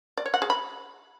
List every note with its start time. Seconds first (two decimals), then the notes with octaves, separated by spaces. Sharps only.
0.18 D5
0.26 C#5
0.34 F#5
0.42 G#4
0.50 B5